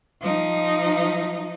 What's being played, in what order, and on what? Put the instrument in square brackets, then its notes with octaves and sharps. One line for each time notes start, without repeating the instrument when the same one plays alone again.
[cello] F3 D#4